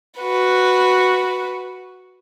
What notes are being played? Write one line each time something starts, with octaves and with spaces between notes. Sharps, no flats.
F#4 B4